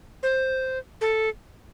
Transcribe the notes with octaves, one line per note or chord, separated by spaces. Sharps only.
C5
A4